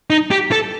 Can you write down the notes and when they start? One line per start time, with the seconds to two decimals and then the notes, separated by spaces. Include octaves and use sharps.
0.10 D#4
0.31 G4
0.52 A4